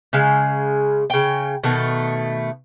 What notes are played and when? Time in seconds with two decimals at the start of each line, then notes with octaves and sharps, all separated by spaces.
0.13 C#3 G#3
1.10 C#3 G5
1.63 B2 D#3 A3